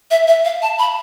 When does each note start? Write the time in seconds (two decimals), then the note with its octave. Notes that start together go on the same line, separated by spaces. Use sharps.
0.11 E5
0.28 E5
0.45 F5
0.62 A5
0.79 B5